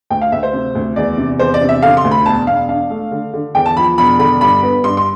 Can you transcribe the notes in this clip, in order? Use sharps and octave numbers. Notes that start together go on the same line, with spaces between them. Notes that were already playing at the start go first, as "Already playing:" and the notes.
D2 G5
F5
D2 E5
C5
C3
D2
E2 D5
C3
E2 C5
D5
C3
E5
D3 F5
C6
D2
B5
E1 A5
E1 F5
D4 F5
A3
D3
D3
E2 G5
A5
F3 B5
E1 B5
D3 B5
G2 B5
B3
G2 C6
C6